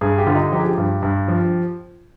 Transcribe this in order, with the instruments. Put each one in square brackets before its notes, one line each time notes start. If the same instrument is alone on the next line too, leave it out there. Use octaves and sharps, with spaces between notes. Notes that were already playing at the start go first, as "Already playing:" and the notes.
[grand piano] G2 G#4
G4
D3 F4
D#4
F3 G4
G#4
G4
G2
G2
F3